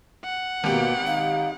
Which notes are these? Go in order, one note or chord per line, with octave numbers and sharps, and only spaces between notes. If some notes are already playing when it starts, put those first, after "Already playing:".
F#5
G#1 B2 A#3 G4
D#4 F5